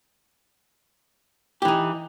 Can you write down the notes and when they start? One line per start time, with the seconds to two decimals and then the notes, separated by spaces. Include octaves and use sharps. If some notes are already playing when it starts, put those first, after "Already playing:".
1.62 G4
1.65 E3
1.68 D#4